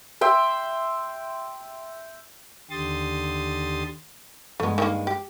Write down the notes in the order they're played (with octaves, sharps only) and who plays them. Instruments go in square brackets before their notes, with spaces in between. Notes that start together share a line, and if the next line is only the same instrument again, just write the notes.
[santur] E5 G5 C6
[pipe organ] D#2 D3 G4 C6 D#6 A6
[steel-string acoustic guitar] G2 G#3 [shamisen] A3 B3
[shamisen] D#3 F3 A#3
G4